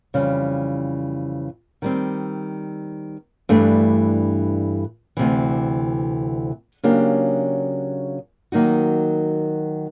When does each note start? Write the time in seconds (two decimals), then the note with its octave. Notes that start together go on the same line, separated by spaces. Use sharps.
0.14 F2 C#3 E3 G3
1.82 D#3 G3 C4
3.49 G2 E3 A3 D4
5.17 D2 C3 E3
6.83 C#3 F#3 A#3 D4 G4
8.52 D#3 F#3 A#3 D#4 F#4